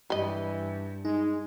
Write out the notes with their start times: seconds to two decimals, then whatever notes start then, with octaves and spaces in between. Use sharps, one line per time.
0.10 G2 E3 G3 D#5
1.05 G#3 D#4